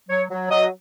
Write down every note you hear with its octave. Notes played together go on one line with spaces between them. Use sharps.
F#3 C#5
F#3
F#3 D#5